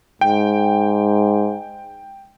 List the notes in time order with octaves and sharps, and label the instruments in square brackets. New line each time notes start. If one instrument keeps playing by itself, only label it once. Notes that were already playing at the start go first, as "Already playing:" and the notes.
[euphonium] G#2 [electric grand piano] G5